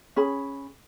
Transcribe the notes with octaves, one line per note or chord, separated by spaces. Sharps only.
C#4 G#4 B5